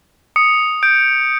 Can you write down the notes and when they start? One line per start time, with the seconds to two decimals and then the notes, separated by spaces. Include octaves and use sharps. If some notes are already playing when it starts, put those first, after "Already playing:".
0.36 D#6 C#7
0.83 G6 D7